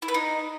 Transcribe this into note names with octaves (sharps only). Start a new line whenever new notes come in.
E4
B4
D#4